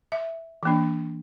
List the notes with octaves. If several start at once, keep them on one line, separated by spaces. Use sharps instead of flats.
E5
E3 A#3 D4